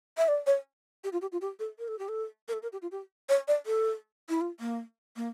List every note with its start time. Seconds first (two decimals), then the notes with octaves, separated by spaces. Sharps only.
0.18 E5
0.28 D5
0.47 C#5
1.04 G4
1.13 F4
1.22 G4
1.32 F4
1.41 G4
1.60 A4
1.79 A#4
1.88 A4
1.99 G4
2.09 A4
2.48 A#4
2.53 A4
2.63 A#4
2.73 G4
2.82 F4
2.92 G4
3.29 C#5
3.48 D5
3.66 A4
4.29 E4
4.41 F4
4.60 A#3
5.16 A#3